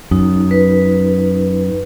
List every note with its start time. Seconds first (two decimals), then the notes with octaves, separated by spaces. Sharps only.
0.11 F#2 D#4
0.51 B4
0.92 B4